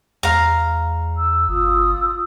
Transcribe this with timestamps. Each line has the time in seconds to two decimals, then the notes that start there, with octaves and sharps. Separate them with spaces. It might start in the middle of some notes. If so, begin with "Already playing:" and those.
0.23 E2 F5 A#5
1.17 E6
1.48 G1 F4 D#6 E6